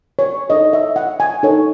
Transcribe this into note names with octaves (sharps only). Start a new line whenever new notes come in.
C#5
D#4 A4 C#5 D#5
E5
F#5
G#5
D#4 A4 C#5